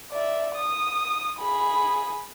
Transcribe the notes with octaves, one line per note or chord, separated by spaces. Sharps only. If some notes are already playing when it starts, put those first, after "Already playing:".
D5 E5
D#6
G#4 B5